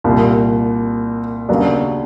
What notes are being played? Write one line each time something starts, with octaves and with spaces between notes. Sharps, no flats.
C2 A#2 G3
D#2 C#3 F#3 B3 D4